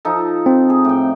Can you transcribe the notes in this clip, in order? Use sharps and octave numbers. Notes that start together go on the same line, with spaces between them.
F3 D#4 A4
C4
G#4
A2 G5